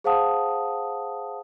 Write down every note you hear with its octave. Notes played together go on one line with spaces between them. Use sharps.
G#4 C5 F5 F#5 A5 D#6